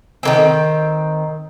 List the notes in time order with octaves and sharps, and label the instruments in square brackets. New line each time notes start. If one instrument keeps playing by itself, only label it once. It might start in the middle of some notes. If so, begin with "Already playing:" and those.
[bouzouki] D#3 A#3 C4